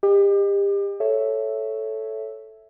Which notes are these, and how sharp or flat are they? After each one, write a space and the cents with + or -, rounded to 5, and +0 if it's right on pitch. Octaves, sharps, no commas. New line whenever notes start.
G4 +30 D#5 -25
A4 -5 C#5 +0 E5 +0